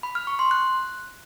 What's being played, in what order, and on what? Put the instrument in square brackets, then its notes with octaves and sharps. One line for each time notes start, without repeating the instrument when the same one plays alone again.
[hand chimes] B5
F6
C#6
C6
F#6